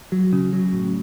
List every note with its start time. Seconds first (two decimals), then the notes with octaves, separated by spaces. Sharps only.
0.12 F#3
0.33 C#3
0.53 F#3
0.73 A2